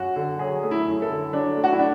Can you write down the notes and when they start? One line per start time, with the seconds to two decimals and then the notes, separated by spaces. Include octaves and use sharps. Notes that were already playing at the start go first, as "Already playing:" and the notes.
Already playing: F#2 F#4
0.16 D3
0.39 F#3 G#4
0.63 A3
0.71 E4
0.86 F#2
1.02 A4
1.09 D3
1.33 F#3 D4
1.56 A3
1.64 F#4
1.72 E4
1.79 D4